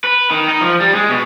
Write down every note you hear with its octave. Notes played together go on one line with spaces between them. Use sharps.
B4
D#3
D#4
F3
G3
G#3
B2